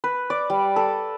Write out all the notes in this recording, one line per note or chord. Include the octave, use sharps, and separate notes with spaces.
B4
D5
G3
A4